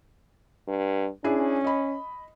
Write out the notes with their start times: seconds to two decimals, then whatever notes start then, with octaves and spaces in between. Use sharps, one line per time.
0.68 G2
1.24 C#4 D4 E4 G#4
1.64 D#5 B5